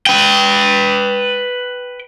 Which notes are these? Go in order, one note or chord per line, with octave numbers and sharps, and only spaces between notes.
B4 G5